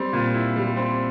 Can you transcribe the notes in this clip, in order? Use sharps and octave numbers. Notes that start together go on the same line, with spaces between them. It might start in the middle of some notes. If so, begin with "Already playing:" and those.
Already playing: G3 C4
A#2
E4
G3
C4